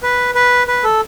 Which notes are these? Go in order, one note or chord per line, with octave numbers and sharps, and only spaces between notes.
B4
B4
B4
A4